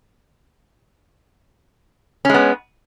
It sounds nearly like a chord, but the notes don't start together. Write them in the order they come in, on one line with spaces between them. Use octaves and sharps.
C#4 G#3 B3